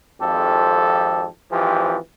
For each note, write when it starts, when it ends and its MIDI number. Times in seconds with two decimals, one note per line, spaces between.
0.21 1.25 32
0.21 1.25 41
0.21 1.25 53
0.21 1.25 67
0.21 1.25 69
1.52 1.96 32
1.52 1.96 52
1.52 1.96 53
1.52 1.96 67